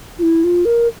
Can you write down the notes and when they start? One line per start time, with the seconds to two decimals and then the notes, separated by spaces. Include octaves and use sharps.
0.18 F4
0.22 E4
0.44 F4
0.65 A#4